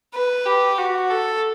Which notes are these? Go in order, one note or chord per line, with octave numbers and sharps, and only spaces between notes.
B4
G4
F#4
A4